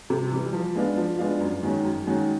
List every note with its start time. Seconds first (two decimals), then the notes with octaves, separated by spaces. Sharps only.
0.10 C3
0.32 E3 G3
0.53 F3
0.75 G#3 B3 D4 F4
0.97 F3
1.19 G#3 B3 D4 F4
1.41 F#2
1.63 D#3 G#3 C#4 F#4
1.85 F#2
2.07 D#3 G#3 C#4 F#4